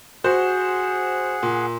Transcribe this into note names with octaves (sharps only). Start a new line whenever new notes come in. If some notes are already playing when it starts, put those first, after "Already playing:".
F#4 G#4 C5 F#5
A#2